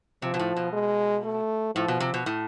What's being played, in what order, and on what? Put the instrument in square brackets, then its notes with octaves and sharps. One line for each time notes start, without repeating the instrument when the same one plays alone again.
[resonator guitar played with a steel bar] C3 [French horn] F3
[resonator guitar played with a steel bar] B2
A2
B2
[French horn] G#3
A3
[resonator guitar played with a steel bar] A2 [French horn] F3
[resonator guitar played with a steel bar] B2
C3
B2
A2